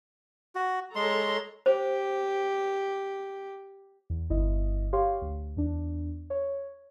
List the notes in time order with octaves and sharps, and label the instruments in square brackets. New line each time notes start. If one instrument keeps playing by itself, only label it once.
[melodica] F#4
[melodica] G#3 C6 [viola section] A4 C#5 A#5
[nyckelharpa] G4 [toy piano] C5
[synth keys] E2
G1 E4 D#5
G4 C#5 F5 C6
D2
E2 D4
C#5